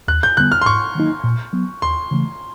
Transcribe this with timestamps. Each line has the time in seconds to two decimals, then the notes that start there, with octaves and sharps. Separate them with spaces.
0.08 D#2 F#6
0.23 G6
0.37 D3 G3 B3 F#6
0.52 F6
0.62 C6
0.66 G#2 C#6
0.95 D#3 F#3 A#3 D#4
1.24 A#2
1.53 F#3 B3
1.82 D#2 C6
2.11 C#3 E3 A3